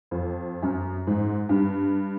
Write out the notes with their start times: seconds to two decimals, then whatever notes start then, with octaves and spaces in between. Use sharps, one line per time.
0.11 F2
0.62 F#2
1.07 G#2
1.49 G2